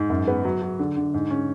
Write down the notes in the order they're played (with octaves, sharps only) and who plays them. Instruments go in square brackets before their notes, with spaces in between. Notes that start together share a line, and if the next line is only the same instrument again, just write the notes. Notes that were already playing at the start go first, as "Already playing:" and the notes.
Already playing: [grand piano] G#2
F#2
B3
F#3
F#3
D3
D3
G#2
C#4